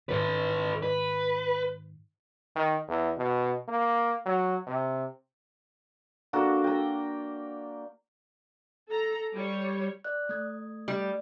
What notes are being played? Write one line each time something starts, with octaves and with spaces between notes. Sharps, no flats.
G#2 D#3 A4 B4
B4
D#3
E2
B2
A#3
F#3
C3
A#3 D4 F#4 A4
G5 A#5
A4 A#5
G3 C#5
D5 F#6
A3 D#6 G#6
G3